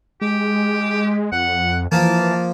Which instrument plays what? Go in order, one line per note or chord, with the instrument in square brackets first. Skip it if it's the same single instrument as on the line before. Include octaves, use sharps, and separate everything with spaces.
[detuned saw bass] G#3 [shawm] G4
[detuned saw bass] F2 [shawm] F#5
[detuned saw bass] E3 [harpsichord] F3 A#3 [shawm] A5